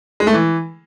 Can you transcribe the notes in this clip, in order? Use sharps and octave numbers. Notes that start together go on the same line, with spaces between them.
G#3
A3
E3